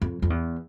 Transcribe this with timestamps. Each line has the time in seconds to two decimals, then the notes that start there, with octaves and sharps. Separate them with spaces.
0.02 F2
0.22 F2
0.30 E2